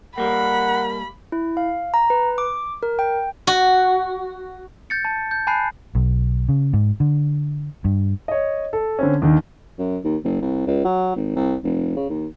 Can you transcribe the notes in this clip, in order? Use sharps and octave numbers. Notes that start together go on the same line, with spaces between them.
G3 A#3 A#4 F#5 B5
E4
F5
A#5
B4
D6
A#4
G5
F#4
G6 A6 C#7
A5
G6
G#5 A5 B5 F#6 C7
B1
C#3
G#2
D3
G2
C#5 D#5
A4
D3 C4 C#4
D#2 D3 D#3
F#2
D#2
F#1
C2
C#2
F#3
G#1
C2
F1
C#3
D#2